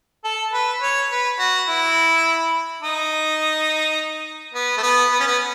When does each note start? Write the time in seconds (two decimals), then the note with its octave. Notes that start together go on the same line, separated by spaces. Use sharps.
0.24 A4
0.53 B4
0.81 C#5
1.11 B4
1.39 F#4
1.68 E4
2.82 D#4
4.54 B3
4.77 A3
4.83 B3
5.12 B3
5.20 C#4
5.27 B3